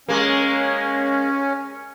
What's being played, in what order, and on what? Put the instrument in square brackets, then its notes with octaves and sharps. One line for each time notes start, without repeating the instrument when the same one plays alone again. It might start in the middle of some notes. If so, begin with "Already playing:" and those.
[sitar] G#3 A#3 [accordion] C#4